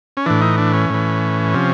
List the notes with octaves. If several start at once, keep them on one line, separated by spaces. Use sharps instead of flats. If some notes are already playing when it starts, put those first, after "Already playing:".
C#4
A2 E3 D4
D#4
D4
C#4
A2 E3
C3 F3